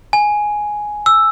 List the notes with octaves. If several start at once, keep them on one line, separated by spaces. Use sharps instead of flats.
G#5
E6